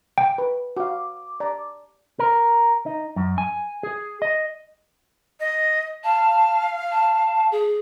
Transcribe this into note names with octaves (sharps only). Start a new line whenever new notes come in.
G5
B4
F#4 F5 D6
D5 A#5
A#4
D#4
F#2
G#5
G#4
D#5
D#5
F5 A5
A5
G#4